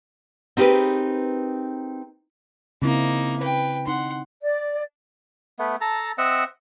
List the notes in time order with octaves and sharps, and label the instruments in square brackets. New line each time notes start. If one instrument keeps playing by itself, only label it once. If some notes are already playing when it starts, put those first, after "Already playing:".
[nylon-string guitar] C4 D#4 G4 G#4 A#4 B4
[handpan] C#3 C4 E4 [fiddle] A#3 D#4
[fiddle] B4 G5
[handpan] C4 D#4 [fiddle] F#5 C6
[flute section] D5
[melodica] A3 B3
A4 A5 A#5
C4 D#5 E5 F#5